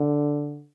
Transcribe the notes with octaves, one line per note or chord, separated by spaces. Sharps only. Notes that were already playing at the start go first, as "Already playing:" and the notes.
Already playing: D3